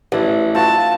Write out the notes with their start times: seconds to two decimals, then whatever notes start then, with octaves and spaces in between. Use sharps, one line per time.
0.12 A1 D4 E4
0.55 C4 F4 F#4 A5